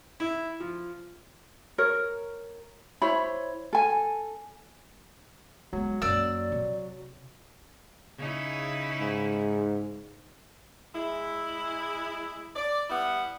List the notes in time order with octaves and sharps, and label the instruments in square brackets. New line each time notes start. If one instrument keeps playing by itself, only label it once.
[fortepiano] E4
F3
[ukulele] A#4 C#5
E4 C5 C#5 B5
A4 G#5
[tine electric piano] F#3 [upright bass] G#3 B3
[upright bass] F#2 A#3 [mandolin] D5 E6
[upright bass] C3
[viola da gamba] C#3 D#4 E4
[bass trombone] G#2
[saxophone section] G#3 E4
D5
G3 B3 E4 F#5